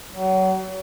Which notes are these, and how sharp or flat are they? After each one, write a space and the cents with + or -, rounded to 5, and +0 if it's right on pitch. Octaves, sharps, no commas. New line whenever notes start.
F#3 +30